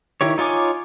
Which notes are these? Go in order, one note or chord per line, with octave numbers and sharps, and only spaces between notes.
D#3 E4 G4 C#5
D#4 F4 C#5 G#5 D6